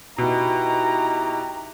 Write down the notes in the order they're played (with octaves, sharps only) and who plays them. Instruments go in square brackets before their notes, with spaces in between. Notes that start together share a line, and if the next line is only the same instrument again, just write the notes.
[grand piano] B2 [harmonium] D#4 E4 G4 [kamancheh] A#5